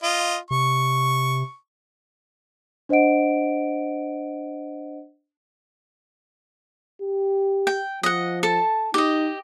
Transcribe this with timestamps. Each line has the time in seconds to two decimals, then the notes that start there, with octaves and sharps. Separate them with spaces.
0.03 F4 D#5
0.51 C3 C#6
2.89 D4 C5 D#5 F#5 D7
7.02 G4
7.67 G5
8.03 F3 D#5 F#5
8.43 A4 A5
8.94 D#4 G4 D#5